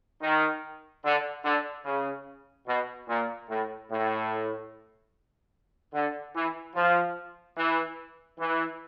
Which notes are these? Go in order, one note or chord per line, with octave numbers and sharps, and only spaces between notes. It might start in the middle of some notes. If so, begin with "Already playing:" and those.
D#3
D3
D3
C#3
B2
A#2
A2
A2
D3
E3
F3
E3
E3